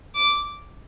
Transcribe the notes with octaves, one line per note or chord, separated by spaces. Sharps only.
D6